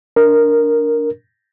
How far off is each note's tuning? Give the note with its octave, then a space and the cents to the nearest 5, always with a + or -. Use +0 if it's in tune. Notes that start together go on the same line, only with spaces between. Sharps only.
D4 -10 A#4 +0